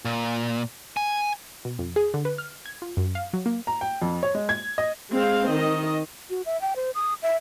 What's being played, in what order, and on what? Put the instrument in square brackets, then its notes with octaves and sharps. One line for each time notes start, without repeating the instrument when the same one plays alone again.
[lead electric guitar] A#2
G#5
[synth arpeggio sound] B2
F2
G#4
D3
B4
F6
G#6
F4
F#2
F5
F#3
A#3
[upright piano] A#5
G5
F2
C#5
G#3
G#6
D#5
[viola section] G#3 C4 F5
D#3 D#5
[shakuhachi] F#4
E5
G5
C5
D#6
E5